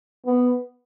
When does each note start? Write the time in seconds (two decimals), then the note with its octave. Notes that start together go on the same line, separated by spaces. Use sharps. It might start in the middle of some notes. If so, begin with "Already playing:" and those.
0.26 B3